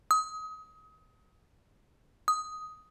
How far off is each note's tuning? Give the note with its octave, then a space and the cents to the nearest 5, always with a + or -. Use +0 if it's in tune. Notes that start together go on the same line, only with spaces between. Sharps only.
D#6 +30
D#6 +10